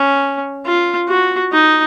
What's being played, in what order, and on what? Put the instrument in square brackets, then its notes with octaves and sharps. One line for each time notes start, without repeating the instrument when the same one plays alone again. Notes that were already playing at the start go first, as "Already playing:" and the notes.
Already playing: [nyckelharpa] C#4
F4
F#4
D#4